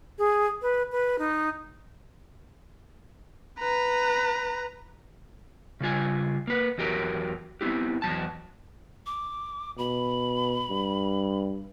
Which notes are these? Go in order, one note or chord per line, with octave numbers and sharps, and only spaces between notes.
G#4
B4
B4
D#4
B4 A#5
C#3 G3 F4 G#5
A#3 B4
E2 F#3 G4 A#4
B3 C4 E4 G4
E2 B2 F#3 A5
D6
B2 B5
G2